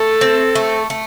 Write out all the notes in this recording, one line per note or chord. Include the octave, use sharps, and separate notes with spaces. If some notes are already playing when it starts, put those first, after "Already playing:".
Already playing: A3 A4
C4
A3
A3